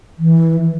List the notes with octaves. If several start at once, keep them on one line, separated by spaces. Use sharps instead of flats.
E3